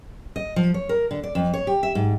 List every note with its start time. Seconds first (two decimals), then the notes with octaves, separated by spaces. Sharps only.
0.36 D#5
0.56 F3
0.74 C#5
0.89 A#4
1.11 D3
1.23 D5
1.35 F2
1.54 C#5
1.67 G4
1.83 E5
1.95 G#2